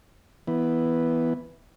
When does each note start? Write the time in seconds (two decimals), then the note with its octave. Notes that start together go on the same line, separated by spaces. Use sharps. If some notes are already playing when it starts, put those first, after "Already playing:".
0.47 E3 B3